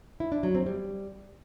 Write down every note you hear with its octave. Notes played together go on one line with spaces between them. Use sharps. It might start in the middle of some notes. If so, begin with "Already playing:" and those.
E4
D4
F#3
C4
G3